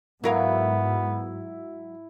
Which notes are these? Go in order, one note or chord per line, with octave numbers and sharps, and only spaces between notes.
G#2 F#3 B3 E4 A#4 E5 F5